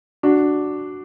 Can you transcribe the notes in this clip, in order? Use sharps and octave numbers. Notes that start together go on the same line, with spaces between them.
D4 F#4